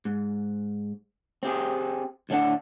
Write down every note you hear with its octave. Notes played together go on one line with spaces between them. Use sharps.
G#2
C4 G4 G#4
D2 A2 F3 D4 F#5